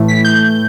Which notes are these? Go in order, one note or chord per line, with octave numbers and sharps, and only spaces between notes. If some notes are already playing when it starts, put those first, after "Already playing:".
Already playing: A2 E3 A3
B6
G6